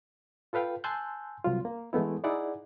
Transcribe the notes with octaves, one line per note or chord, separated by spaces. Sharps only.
F4 A4 B4 F5 G5
G#5 A5 C6 E6 F#6 G6
C2 F#3 F4
A#3
E3 G#3 A3 B3 E4
D#4 E4 G#4 D5 F#5